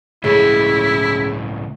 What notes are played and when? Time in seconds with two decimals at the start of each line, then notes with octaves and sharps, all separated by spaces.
0.24 C#2 A2 C#3 E4